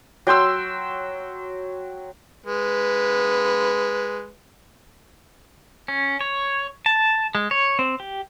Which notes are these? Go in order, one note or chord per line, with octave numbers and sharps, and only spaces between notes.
F#3 G5 C6 E6
G#3 B4
C#4
C#5
A5
G#3
C#5
C4
G4